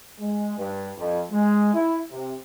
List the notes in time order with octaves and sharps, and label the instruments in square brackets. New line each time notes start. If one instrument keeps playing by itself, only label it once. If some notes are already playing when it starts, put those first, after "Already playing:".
[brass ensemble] G#3
G2
F2
G#3
E4
C3